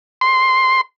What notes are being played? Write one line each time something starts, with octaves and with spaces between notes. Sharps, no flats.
C6